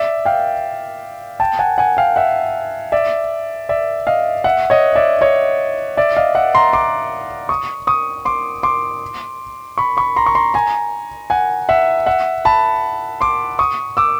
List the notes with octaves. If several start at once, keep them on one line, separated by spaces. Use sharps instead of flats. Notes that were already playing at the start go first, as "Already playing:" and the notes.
Already playing: D5 E5
F5 G5
G5 A5
F#5 G#5
F#5 G#5
F5 G5
E5 F#5
D5 E5
D5 E5
D#5 F5
E5 F#5
C#5 D#5
D5 E5
C#5 D#5
D5 E5
D#5 F5
E5 F#5
A#5 C6
C6 D6
C#6 D#6
C#6 D#6
C6 D6
C6 D6
B5 C#6
B5 C#6
A#5 C6
C#6
A#5 C6
G#5 A#5
F#5 G#5
E5 F#5
E5 F#5
A5 B5
C6 D6
C#6 D#6
D6 E6